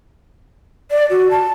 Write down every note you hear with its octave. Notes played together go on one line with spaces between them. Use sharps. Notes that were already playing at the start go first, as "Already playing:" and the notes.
D5
F#4
A5